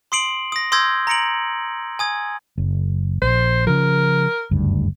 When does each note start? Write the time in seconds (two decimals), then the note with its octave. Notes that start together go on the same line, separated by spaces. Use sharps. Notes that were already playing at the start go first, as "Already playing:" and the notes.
0.12 C6 D#6 C7 D7 F#7
0.52 D#6 A#6
0.72 C6 D#6 E6 G6 G#6 A#6
1.07 A#5 A#6 C#7 D7 F#7
1.99 G#5 D#6 G#6
2.58 F#1
3.22 A#1 C5
3.67 C#3 F3 A#4
4.51 F#1 D2 G2